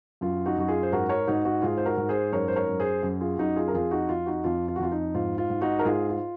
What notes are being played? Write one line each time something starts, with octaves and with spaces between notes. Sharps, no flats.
F#2 F4
D#4 F#4
F#2 F#4
F4 G#4
C5
G#2 F#4 A#4
A#4 C#5
G#2 D#4 F#4
D#4 F#4
G#2 F4 G#4
C5
F#4 A#4
G#2
G#4 C5
F#2 A#4 C#5
C5
A#4 C#5
F#2
G#4 C5
F#2
F4 G#4
F#2 D#4 F#4
F4 G#4
A#4
F2 F4 G#4
D#4 F#4
F2 F4
D#4 F#4
F2 F4
F4
F#4
F2 F4
D#4
G#2 F4
F4
G#2
D#4 F#4
A#4
G#2 F4 G#4
F4